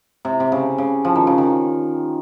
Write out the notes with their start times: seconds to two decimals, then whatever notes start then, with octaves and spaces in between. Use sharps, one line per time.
0.25 C3
0.40 C3
0.52 C#3
0.78 C#3
1.05 F3
1.15 D#3
1.27 C#3
1.38 D#3